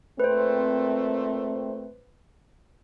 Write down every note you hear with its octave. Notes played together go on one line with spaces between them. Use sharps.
A#2 A3 C4 B4 C5